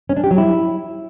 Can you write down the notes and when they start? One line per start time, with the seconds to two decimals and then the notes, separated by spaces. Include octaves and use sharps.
0.09 C#4
0.17 D4
0.24 G4
0.31 F#3
0.38 E4